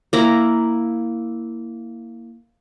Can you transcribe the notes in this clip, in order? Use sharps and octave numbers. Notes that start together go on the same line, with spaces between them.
A#3 E4 A#5